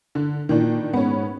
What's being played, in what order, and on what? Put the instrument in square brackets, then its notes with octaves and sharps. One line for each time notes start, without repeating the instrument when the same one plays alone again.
[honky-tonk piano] D3
[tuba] A#2 [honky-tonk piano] D#3 E3 D4
[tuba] G#2 [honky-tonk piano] B3 C#4